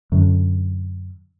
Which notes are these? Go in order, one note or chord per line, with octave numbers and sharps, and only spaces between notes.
F#2 D3